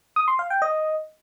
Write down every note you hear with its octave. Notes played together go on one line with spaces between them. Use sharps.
D#6
C6
F5
G5
D#5